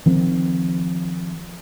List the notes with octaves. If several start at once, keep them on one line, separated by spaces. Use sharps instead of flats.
D#3 F3 C4